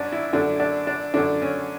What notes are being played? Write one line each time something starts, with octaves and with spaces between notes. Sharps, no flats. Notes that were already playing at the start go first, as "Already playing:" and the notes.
Already playing: F#2 C#4 D4
E4
F#2 D3 D4
D4
D4
F#2 D3 D4
C#4